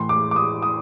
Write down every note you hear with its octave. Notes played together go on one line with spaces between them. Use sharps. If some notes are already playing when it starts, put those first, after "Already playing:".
Already playing: A2 E3 C6
D6
D6
D#6
D#6